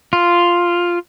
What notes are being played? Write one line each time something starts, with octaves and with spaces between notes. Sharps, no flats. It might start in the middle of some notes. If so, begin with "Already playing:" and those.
F4